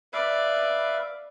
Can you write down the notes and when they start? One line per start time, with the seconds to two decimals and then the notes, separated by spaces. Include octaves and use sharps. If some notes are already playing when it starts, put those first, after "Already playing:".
0.13 B4 D5 E5 F5